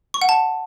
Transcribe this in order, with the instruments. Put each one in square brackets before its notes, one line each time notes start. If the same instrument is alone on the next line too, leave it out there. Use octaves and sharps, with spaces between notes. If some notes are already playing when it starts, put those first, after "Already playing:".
[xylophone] C#6
F#5
A5